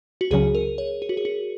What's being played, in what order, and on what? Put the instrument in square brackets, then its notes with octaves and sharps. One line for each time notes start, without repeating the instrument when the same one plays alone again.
[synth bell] F#4
[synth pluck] C#2 C#3 F#3 C#4 [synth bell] G#4
[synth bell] A#4
C#5
G#4
F#4
G#4
F#4